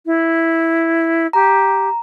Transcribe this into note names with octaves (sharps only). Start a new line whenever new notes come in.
E4
G4 A#5